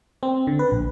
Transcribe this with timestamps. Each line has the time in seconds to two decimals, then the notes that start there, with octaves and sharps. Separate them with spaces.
0.23 C4
0.47 D3
0.59 B4
0.72 A#1